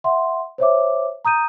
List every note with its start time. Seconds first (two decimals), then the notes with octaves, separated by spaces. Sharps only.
0.04 E5 F#5 C6
0.58 C5 C#5 E5 D6
1.25 A#5 D#6 G6 D#7